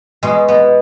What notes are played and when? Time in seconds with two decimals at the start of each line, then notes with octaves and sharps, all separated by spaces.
0.23 B2 G#3
0.48 B3